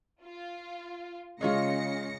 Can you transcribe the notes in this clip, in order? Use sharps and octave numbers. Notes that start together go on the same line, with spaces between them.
F4
C#3 G#3 C#4 F4 A#6 C#7